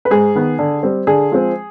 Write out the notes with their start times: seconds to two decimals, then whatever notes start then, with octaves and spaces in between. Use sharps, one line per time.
0.05 B4
0.10 G#2 G#4
0.35 D#3 B3
0.59 D3
0.83 G3 C4
1.07 D3 G#4
1.32 F3 G#3 C4